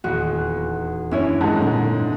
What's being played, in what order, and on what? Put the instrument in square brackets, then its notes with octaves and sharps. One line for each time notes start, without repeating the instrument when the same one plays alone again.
[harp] D#1 E2 [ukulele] F#4
[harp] F#2 D4 [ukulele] C#4 E4 C#5
[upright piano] G#2 G#3 [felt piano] F#5 A5
[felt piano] A#2 D3